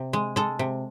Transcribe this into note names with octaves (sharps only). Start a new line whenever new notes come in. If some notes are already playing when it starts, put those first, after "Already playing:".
Already playing: C3
G#3
G#3 A4
C3